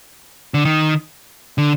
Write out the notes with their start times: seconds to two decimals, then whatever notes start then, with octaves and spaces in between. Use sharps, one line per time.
0.54 D3
0.65 D#3
1.58 D3